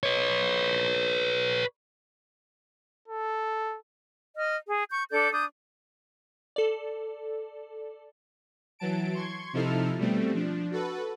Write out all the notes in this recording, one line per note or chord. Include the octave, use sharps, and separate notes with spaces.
B4 C#5
A4
D#5 F6
G#4
C#6 G6
D4 A4 D5 G6
D4 D#6 G6
A4 D5
E3 F#3 A5 D7
C6 C#6 G#6
C3 F3 D#4 E4 A4 F6
B2 G3 A3 C4
F3 D4
F#4 A4 B4